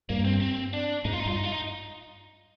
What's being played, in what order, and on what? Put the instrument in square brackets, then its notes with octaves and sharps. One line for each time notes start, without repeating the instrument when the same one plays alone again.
[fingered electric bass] G2 [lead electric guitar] A#3
[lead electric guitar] C4
C4
D4
[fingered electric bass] G#2 [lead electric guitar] D#4
[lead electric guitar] F4
D#4
[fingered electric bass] G2 [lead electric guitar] F4
[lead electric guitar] D#4
F4
D#4